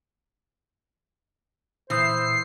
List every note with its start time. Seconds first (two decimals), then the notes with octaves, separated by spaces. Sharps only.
1.90 A#2 E3 C5 D#6 G6 C7